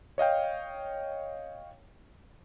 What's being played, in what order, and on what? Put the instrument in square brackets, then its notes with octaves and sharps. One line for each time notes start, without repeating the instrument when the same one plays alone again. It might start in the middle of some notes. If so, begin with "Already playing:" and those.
[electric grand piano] C#5 D#5 F5 G5